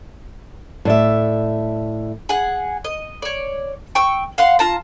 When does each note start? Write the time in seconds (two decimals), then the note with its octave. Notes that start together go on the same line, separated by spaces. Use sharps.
0.85 A2 D5 E5
2.29 G#4 F#5
2.85 D#5
3.22 C#5 D5
3.95 G5 C#6 E6
4.38 F5 F#5 C6
4.59 F4 A5 A#5